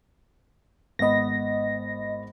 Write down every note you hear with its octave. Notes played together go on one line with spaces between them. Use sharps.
G#1 B3 D#5 B5 A#6